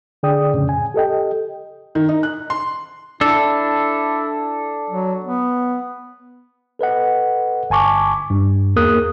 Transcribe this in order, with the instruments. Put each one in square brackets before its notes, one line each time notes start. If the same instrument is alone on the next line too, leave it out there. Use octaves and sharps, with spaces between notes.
[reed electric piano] D3 G#4 D5 G5 D#6
F2 A2 C#3 C#4
G#5
G4 A4 D#5 G5
[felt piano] D#3
D#4
F#6
C6
[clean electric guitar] D4 A4 [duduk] E4
[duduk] F#3
B3
[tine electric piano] A4 B4 D#5 F#5
G1 G#5 A5 C#6 D6
G2
E2 A#3 G#4 A#4 D#6 F#6